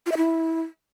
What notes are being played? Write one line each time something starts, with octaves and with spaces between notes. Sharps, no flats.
F4
E5
E4